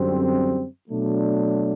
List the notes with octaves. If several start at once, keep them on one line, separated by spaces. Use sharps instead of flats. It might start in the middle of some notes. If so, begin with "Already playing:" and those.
Already playing: F#2 D3 G3 C4
B2 F#3 A3 D4